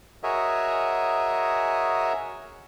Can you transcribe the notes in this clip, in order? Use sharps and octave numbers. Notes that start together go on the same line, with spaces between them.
F#4 G#4 A#4 C#5 D#5 E5